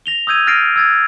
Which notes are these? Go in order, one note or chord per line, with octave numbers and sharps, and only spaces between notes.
A#6 F7 G7
D#6 E6 G6 G#6 D#7
F6 A6 A#6 C7 D7 D#7
E6 G#6 A6